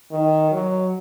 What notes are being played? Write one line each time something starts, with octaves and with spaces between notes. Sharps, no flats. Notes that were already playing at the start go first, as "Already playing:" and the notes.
D#3
F#3